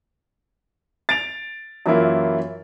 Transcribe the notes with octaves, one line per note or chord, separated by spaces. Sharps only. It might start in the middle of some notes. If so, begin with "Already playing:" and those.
A6 D7 F7
F#2 E3 A#3 E4 F4